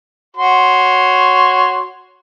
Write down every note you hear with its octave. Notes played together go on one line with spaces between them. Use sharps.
F#4 C#5 C6